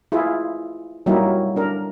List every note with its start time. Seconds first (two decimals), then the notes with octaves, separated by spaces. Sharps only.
0.12 E4 F4 G#4
1.06 F#3 G3 A#3 D#4 E4 G4
1.56 D4 A#4